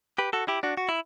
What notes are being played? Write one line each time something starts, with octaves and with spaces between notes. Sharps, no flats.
G4 B4
F#4 A4
E4 G4
D4 F#4
F#4
E4